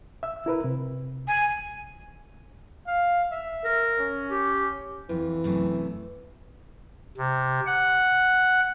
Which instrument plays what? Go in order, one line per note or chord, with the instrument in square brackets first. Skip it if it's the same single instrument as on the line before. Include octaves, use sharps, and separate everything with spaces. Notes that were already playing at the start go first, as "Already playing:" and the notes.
[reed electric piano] E5 E6
E4 A#4 B4
C3
[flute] G#5
[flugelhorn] F5
E5
[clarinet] A#4
[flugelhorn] C#4
[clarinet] G4
[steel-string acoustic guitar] F2 [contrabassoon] E3
[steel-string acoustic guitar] F#2 C3 A3
[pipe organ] C3
F#5